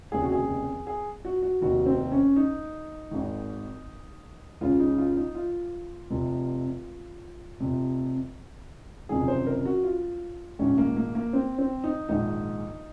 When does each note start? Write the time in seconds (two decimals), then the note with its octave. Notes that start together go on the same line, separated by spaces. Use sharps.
0.12 F1 D#2 C#3 G#4
0.22 F#4
0.32 G#4
0.87 G#4
1.25 F#4
1.43 F#4
1.62 F1 D#2 D#3 F#4
1.86 C4
2.12 C#4
2.36 D#4
3.11 G#1 G#2 D#3
4.61 C#2 C#3 F4
4.80 D#4
4.98 F4
5.17 D#4
5.35 F4
6.10 F1 F2 C3
7.60 F1 F2 C3
9.09 F#1 F2 C3 D#3 G#4
9.28 C5
9.47 A#4
9.65 F#4
9.84 F4
10.59 A#1 G#2 D#3 C#4
10.78 A#3
10.96 A#3
11.15 A#3
11.33 C4
11.59 C4
11.84 D#4
12.09 A#1 G#2 D#3 D#4